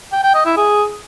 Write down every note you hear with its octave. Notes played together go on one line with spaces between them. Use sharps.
G5
G5
D#5
E4
G#4